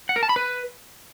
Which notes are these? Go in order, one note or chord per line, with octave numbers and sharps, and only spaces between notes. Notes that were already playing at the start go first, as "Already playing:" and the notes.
F#5
A#4
A5
B5
B4